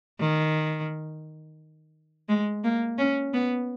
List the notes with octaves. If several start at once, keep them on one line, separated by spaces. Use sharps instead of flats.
D#3
G#3
A#3
C#4
B3